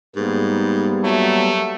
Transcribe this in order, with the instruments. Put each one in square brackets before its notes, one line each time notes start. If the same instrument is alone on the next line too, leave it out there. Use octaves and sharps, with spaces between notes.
[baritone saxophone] G#2 [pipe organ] G3 A#3 B3
[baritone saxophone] F#3 [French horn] A3